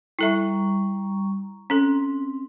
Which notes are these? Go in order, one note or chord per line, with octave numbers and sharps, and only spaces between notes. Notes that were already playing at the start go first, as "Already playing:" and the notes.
G3 E4 A4 E5 A#5 C#6
C4 C#4 A4